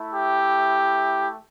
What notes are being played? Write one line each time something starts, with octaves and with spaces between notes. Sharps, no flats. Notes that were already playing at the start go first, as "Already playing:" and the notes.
Already playing: A3 E4
G4